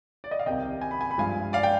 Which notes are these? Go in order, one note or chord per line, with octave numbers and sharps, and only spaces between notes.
D5
D#5
F5
C2 C3 D#3 D#5 G5
G#5
B5
G#5
B5
G2 F3 G#3 F5 G#5
D5 F5
G5